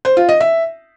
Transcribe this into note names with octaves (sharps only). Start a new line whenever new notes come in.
C5
F4
D#5
E5